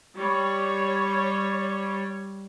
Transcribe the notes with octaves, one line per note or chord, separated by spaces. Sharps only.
G3 C#5